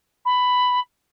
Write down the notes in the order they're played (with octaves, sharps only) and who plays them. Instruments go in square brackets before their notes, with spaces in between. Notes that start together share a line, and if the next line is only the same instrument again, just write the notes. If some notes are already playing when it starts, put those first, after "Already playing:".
[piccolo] B5